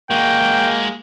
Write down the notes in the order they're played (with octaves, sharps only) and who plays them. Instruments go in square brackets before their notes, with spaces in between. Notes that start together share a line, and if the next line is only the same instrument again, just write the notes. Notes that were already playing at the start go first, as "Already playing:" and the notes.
[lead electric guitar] G#3 F#4 [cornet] A#3 [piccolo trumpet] G5